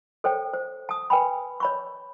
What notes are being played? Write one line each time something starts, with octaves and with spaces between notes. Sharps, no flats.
A4 C5 C#5 G5
C5
A5 D#6
B4 G5 G#5 B5
C#5 B5 C#6